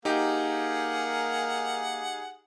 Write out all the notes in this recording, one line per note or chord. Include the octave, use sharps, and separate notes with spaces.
A#3 D#4 G4 G#4 A#4 F#5